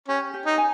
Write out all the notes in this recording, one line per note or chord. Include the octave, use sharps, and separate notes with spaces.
C#4 G4
G4
D#4
G#5